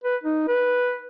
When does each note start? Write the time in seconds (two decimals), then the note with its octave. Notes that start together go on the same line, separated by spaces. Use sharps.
0.04 B4
0.24 D#4
0.48 B4